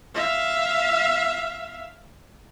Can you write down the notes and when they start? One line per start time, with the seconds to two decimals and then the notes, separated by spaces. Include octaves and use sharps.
0.15 E5 F5